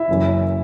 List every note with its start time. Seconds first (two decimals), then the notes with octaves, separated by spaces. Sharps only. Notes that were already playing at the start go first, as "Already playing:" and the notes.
Already playing: E4 E5
0.08 F#1 F#2 E3